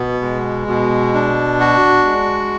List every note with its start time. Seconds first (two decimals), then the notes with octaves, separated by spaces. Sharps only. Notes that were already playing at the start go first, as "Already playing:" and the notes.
Already playing: B2 B3
0.22 G#3
0.68 B2
1.14 D4
1.60 F#4
2.05 G#3